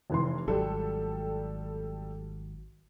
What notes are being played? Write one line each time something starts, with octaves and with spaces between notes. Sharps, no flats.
F1 E3 C6
G#1 F#3 G3 A4